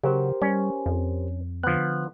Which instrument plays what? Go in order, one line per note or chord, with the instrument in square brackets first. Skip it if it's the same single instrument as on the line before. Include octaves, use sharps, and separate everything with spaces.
[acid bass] C#3 [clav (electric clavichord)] F#3 [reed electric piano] G4 A#4 C5
[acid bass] G3 [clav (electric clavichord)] C#4
[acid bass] F2
[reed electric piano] D3 F#6 [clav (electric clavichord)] F3 B3